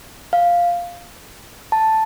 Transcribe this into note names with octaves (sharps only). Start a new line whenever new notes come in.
F5
A5